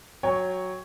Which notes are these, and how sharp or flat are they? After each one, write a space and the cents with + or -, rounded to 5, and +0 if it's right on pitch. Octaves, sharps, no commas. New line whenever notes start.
F#3 +0 C#5 +0 G5 +30